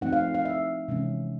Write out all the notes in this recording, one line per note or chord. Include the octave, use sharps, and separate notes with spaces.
F3 A3 C4 D#4 F#5
F5
F5
E5
C3 E3 G#3 C#4